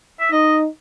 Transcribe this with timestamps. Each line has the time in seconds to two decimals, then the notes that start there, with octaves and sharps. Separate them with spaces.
0.20 E5
0.31 D#4 D#5